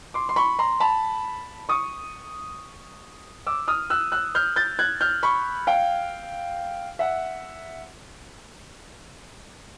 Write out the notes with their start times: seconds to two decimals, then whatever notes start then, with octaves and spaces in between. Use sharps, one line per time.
0.14 C6 D6
0.29 C6
0.36 B5 C#6
0.59 A#5 C6
0.80 A5 B5
1.69 C#6 D#6
3.47 D6 E6
3.68 D#6 F6
3.90 E6 F#6
4.12 E6 F#6
4.35 F6 G6
4.56 G6 A6
4.79 F#6 G#6
5.01 F6 G6
5.23 B5 C#6
5.67 F5 G5
6.99 E5 F#5